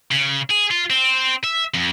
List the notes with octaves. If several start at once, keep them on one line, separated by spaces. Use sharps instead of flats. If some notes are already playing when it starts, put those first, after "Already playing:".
C#3
G#4
F4
C4
E5
F2